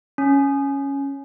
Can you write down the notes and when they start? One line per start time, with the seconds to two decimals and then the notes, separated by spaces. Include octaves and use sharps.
0.18 C#4